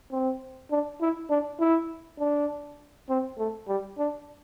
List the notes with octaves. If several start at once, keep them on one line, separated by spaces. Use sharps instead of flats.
C4
D4
E4
D4
E4
D4
C4
A3
G3
D4